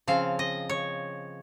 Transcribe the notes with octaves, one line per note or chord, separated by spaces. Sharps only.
C#3 F3 C4 F5
D#5
C#5